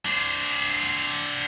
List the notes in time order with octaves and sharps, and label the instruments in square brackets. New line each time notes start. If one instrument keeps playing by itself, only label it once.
[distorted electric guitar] D4 C5